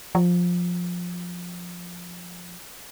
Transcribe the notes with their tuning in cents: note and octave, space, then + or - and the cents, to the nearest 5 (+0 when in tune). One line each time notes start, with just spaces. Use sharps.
F3 +15